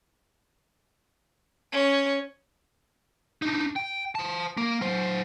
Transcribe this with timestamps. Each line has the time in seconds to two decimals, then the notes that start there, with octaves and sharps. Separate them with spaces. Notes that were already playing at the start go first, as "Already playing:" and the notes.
1.73 C#4
3.42 D4 D#4
3.76 G5
4.15 C5 A5
4.57 A#3
4.81 F#3 C5